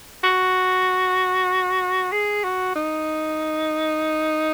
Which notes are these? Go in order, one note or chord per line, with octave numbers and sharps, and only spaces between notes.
F#4
G#4
F#4
D#4